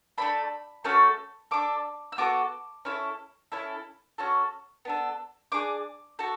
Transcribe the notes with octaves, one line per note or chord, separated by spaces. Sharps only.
A3 D4 A4 B5
A3 C#4 F#4 A4
D4 A4 D6
E6
B3 F#4 A4 D6
C#4 E4 A4
C#4 E4 A4
C#4 F#4 A4
B3 D4 A4
D4 G#4 D6
F#4 A4